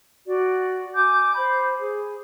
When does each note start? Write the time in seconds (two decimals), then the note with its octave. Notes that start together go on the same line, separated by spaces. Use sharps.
0.25 F#4 D5
0.93 G#5 D6 G6
1.35 C5 B5
1.79 G#4